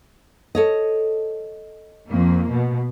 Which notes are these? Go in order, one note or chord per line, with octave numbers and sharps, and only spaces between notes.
A4 C#5 D#5
F2 A#3
B2